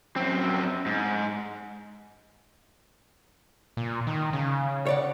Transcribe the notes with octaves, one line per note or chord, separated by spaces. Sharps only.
F#2 C4
G#2
A#2
D#3
C#3
C#5 D5 F#5